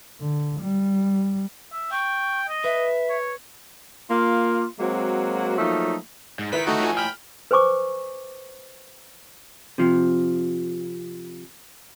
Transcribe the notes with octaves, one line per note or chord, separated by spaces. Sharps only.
D3
G3
E5
G5 C#6
D#5
B4 E5
C#5
A#3 F4
F#3 G#3 A#3 C4 F#4
F3 F#3 A3 A#3 D#4
G#2
D#3 E4 B4 B6
A3 D#4 F#4
A2 F4 G#5
G5 B5 F6
B4 C5 G#5 C#6 D6
C3 F3